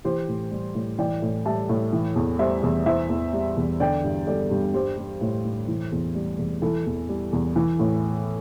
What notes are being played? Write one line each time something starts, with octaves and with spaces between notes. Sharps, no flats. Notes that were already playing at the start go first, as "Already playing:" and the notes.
E3 G4 C5
A2
G3
A2
E3 D5 G5
A2
G3 E5 A5
A2
E3
E2
G3 C5 E5
E2
E3 C5 E5
E2
G3
E2
D3 D5 G5
G2
G3 A4 D5
G2
G3 G4 C5
G3
A2
A2
E3
E2
G3
E2
E3 E4 A4
E2
G3
E2
E3
A2